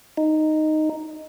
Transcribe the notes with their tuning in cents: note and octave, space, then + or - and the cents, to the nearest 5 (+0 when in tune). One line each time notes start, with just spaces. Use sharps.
D#4 -5